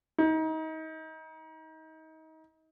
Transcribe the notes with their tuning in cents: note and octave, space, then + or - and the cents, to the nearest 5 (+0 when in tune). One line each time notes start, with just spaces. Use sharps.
D#4 +30